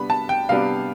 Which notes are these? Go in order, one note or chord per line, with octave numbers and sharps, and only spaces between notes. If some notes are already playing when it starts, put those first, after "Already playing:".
Already playing: C3 G3 B3 D4 B5
A5
G5
C3 G3 B3 D4 F5